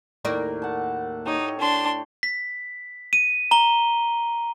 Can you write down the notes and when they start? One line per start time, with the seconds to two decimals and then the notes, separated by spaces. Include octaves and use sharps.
0.25 D#2 A2 A#3 D5
0.62 F#5 A5
1.26 D#4 G4 C#5
1.58 D4 C6
2.23 B6
3.13 D#7
3.51 A#5 G7